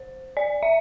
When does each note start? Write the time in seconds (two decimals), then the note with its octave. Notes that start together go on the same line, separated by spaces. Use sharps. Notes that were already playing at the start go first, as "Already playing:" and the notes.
Already playing: C5
0.37 D5
0.63 E5